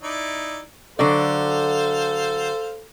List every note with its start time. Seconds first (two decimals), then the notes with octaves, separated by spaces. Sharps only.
0.03 D#4 E4 D5
0.99 D3 F#3 A4 C5 D5 F5